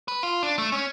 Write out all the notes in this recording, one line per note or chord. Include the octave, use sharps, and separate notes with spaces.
B4
F4
D4
A3
C#4